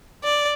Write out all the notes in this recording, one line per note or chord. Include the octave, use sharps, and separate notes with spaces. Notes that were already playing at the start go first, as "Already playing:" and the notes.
D5